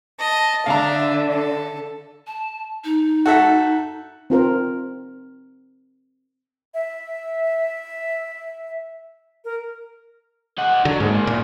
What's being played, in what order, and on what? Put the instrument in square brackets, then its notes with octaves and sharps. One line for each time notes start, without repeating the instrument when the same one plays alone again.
[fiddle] D#5 [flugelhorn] A5
[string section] D3 [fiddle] D4 [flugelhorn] E5 [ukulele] F5 A#5
[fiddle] A4
[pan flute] A5
D#4
[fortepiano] F#4 A4 E5
[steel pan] C4 F4 A#4 C5
[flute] E5
A#4
[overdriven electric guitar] D#4 F#5
[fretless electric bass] D3 [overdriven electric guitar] F#3
[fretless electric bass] G#2 [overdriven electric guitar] C#3 A#3
[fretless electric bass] A#2